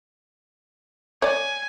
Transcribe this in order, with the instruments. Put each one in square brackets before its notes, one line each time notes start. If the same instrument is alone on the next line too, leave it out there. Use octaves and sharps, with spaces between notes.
[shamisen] C#5 D5 [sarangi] G#5